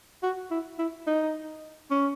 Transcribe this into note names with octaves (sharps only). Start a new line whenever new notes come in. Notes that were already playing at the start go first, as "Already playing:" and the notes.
F#4
E4
E4
D#4
C#4